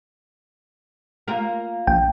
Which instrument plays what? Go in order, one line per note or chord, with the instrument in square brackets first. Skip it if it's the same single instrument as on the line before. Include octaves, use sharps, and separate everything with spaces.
[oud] A#3 F4 A#4
[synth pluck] A#1 [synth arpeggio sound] G5